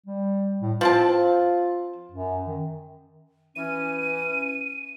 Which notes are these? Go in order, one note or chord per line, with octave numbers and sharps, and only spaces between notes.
G3
A2
F3 C4 F4 A5
F#2
D#3
E3 C#4 D#7